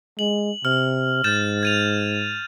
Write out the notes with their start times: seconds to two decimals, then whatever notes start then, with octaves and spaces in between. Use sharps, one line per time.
0.19 G#3 F#7
0.65 C3 F6
1.24 G#2 G6 A6 E7
1.63 G#6 D#7 F7